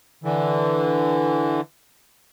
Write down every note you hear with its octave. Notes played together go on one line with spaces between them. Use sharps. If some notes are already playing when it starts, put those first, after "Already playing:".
D3 E3